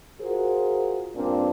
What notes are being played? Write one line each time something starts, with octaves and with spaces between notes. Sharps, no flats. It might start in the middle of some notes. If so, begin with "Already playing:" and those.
F4 F#4 G#4 A#4 C5
G2 A#2 A#3 C4 D4